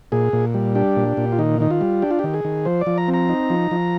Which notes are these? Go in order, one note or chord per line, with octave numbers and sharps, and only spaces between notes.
A#2 G#4
A#2
G3
D4 G4
A#2
A#2
F4
D#3 D#4
D#3 D#4
F4
G3
D4 G4
F4
D#3 G4
G#4
D#3
F3 C5
D5
F3
A#5
C4
A#5
D#4
F3
F3